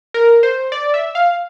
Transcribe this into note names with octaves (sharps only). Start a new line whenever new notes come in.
A#4
C5
D5
E5
F5